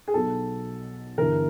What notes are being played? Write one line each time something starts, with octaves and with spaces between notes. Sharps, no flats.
G#4
B1 B2 F#3 A4
G1 G2 E3 A#4